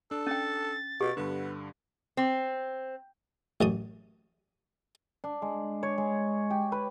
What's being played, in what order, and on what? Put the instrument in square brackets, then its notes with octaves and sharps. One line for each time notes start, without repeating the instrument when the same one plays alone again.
[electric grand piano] D4 [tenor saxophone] A4
[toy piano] C#4 G5 [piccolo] A6
[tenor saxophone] B2 [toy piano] G4 [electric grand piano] D6
[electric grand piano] G2 D3 [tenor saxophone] B3
[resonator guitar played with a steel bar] C4
[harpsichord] A1 F#2 D#6
[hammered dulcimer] D4
G#3
C#5
G#3
G4
B4